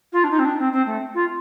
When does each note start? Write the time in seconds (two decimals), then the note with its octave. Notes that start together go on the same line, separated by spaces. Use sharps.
0.12 F4
0.23 D4
0.30 D#4
0.39 C4
0.44 D4
0.59 C4
0.72 C4
0.86 A3
1.14 F4